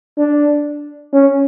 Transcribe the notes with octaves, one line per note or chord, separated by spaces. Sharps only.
D4
C#4